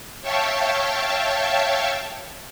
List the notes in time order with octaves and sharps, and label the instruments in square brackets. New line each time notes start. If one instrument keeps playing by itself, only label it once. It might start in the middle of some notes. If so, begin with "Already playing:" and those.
[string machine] C#5 E5 F5 G5 A5 C#6